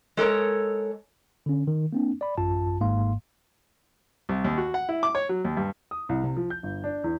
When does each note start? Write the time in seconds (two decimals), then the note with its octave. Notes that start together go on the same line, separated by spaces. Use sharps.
0.17 G#3 A4 A#4 C#5
1.46 D3 C#4
1.67 D#3
1.93 A#3 C4 D4
2.21 D5 B5
2.38 A1 F#2 F4 A5
2.80 G#1 G#2 A#3 F5 C6
4.29 C2
4.44 D#2
4.58 F#4
4.74 F#5
4.89 E4
5.03 D6
5.15 C#5
5.29 F#3
5.45 D#2
5.57 G2
5.91 D#6
6.09 C2
6.23 C3
6.36 F3
6.50 G6
6.63 G1
6.84 D4
7.04 E2